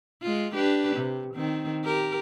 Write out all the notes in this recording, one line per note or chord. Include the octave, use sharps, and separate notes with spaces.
G#3 F4
D4 G4 B4
C3
D#3 C4
G4 A#4